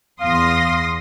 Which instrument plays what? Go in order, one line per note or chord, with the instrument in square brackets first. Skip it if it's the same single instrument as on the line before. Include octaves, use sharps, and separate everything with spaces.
[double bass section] E2 [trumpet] F5 [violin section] C6 D#6 A#6